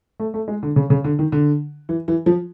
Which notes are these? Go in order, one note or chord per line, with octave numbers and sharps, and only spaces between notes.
A3
A3
G#3
D3
C#3
C#3
D3
D#3
D3
E3
E3
F3